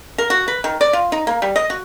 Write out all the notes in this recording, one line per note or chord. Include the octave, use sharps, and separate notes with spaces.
A#4
F#4
B4
D#3
D5
F4
D#4
A#3
G3
D#5
F#4